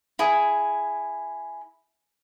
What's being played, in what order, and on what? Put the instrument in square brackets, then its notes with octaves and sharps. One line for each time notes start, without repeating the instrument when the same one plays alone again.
[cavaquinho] E4 G#4